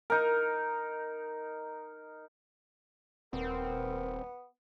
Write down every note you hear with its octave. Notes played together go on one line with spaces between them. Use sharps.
D#4 A#4
D#1 B3 C4 A#4